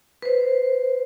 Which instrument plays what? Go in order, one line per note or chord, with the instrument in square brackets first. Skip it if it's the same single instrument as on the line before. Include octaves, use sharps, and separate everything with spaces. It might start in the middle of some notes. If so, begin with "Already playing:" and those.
[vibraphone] B4 C5